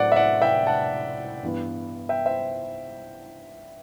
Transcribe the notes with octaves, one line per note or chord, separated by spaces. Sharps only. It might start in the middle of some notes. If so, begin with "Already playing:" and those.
Already playing: A2 F#3 C4 D5 F#5
E5
D5 F#5
E5 G5
F#5 A5
G2 E3 B3
E5 G5
C5 E5